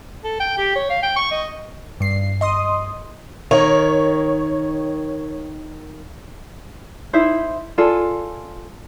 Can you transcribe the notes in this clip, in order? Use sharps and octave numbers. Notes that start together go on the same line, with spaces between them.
A4
G5
G4
C#5
F5
G5
C#6
D#5
G2 C7
D#5 C6 D#6
D#3 C#5
D#4 E4 C5 E5
F4 G#4 A4 D5